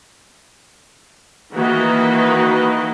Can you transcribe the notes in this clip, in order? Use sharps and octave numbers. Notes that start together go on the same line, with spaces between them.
D#3 E3 A#3 F#4 B4 D#5